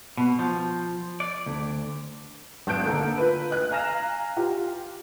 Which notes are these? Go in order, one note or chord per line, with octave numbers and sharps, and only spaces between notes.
B2
F3
D5
D2
G#1 A5 F#6 G6 D7
D3 A#3 A4 A#4
F4 B4
D#5 F#6
F5 G#5 A#5 F6 A#6 E7
F4 G4